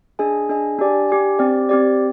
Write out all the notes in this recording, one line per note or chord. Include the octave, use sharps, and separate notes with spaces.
D4 G#4 D#5 G#5
D4 G#4 D#5 G#5
D4 G4 D5 G#5
D4 G4 D5 G#5
C4 G4 D5
C4 G4 D5